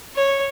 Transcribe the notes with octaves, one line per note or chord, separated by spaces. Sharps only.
C#5